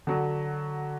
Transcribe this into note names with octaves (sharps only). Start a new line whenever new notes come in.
D3 F#3